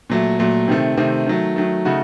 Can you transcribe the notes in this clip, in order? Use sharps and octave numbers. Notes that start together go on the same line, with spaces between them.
A#2 F#3 A3
A#2 F#3 A3
C3 D#3 A3 C4
C3 D#3 A3 C4
D#3 F#3 A3
D#3 F#3 A3
C#3 A3 D#4 F#4